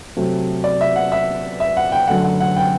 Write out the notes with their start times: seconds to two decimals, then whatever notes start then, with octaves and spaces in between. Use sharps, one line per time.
0.17 C3 F#3 A3
0.64 D5
0.81 E5
0.96 F#5
1.12 E5
1.60 E5
1.77 F#5
1.92 G5
2.08 F#2 D3 A3 F#5
2.24 F#5
2.40 F#5
2.57 G5